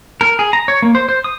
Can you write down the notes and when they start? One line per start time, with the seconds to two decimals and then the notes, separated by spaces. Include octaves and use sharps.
0.21 A#4
0.39 G#4
0.53 A#5
0.68 C#5
0.82 A#3
0.95 C5
1.09 C5
1.24 D#6